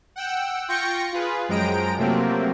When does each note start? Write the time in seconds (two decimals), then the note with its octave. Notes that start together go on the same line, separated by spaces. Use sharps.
0.16 F#5 G5 E6
0.68 F4 G5 C#6 G6 A#6 C#7
1.12 F4 G#4 B4
1.49 F#2 F3 G#3 G5 A#5 D7
1.98 C3 F3 F#3 A3 A#3 C4